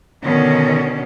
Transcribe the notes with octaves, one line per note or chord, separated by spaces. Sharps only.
B2 D3 D#3 C#4